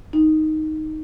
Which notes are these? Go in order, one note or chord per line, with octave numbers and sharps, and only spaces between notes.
D#4